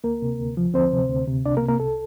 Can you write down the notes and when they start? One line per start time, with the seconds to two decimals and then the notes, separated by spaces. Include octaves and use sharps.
0.04 D2 A#3 A#4
0.22 C3
0.40 D2
0.57 F3
0.74 D2 C4 C5
0.93 C3
1.09 D2
1.27 C3
1.46 C2 D4 D5
1.57 A#3 A#4
1.62 C3
1.69 A#3 A#4
1.80 C2 A4